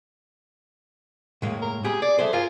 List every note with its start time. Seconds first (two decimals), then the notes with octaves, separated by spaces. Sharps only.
1.42 A2 G#3 A#3
1.62 A#4
1.84 G4 G#4 G#5 B5
2.02 G#4 D5
2.19 G#4 A4 C5 E5
2.33 F4 A#4 G#5